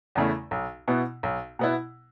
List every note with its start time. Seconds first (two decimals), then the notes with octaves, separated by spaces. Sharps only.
0.15 E2 C#3 A3 E4
0.51 B1
0.88 B2 B3 E4
1.23 B1
1.59 B2 B3 E4